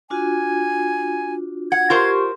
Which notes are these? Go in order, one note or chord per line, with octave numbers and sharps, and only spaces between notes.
D4 F4 F#4 G#5
F#5 G#6
F4 G4 A#4 C5 C#6